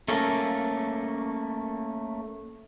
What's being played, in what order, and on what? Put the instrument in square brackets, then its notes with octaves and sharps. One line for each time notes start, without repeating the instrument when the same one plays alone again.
[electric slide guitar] A3 A#3 C#4 A4 A#4